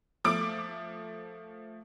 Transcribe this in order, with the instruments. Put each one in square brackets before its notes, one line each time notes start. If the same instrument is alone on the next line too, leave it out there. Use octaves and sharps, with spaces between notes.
[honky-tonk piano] F3 A3 D6 D7